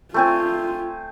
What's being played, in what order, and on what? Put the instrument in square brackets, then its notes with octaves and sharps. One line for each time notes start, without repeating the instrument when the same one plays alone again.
[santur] A3 C4 G#5 [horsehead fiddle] F4